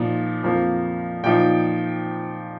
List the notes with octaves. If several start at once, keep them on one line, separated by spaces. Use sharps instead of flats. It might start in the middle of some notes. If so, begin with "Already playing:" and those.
Already playing: A#2 F3 D#4
F2 F3 A#3
A#2 F3 D#4 G5